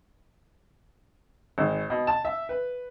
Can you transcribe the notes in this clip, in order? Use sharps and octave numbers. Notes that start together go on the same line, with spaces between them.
G#1
B2
A5
E5
B4